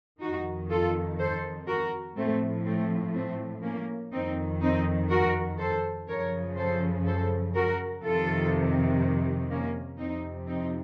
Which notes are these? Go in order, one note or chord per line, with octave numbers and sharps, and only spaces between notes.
F2 D#3 D#4 F#4
F4 A4
A4 C5
F#4 A#4
A2 F3 A3 C4
A3 C4
A3 C4
A#3 C#4
F2 D#3 C4 D#4
C4 D#4
F#4 A#4
A4 C5
F#2 C#3 F3 A#4 C#5
A4 C5
A4 C5
F#4 A#4
F2 C3 D#3 F4 A4
A#3 C#4
F2 C3 F3 C4 D#4
C4 D#4